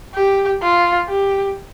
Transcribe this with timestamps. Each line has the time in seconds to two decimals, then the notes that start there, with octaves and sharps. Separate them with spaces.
0.14 G4
0.62 F4
1.08 G4